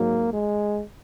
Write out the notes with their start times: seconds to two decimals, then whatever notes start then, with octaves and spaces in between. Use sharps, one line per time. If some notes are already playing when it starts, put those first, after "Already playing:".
Already playing: G#2 F#3 A#3
0.31 G#3